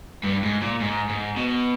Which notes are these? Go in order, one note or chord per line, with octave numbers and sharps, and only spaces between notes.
G2
G#2
A#2
G#2
G#2
B2